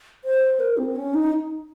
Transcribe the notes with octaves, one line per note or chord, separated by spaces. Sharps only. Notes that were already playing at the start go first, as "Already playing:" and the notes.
C5
A#4
C4
C#4
D#4